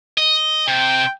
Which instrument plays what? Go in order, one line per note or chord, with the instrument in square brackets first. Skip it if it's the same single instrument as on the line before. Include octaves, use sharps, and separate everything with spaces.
[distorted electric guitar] D#5
[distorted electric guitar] C3 [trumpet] G5